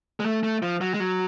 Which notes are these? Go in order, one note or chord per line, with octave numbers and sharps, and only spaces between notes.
G#3
A3
A3
F3
F#3
G#3
F#3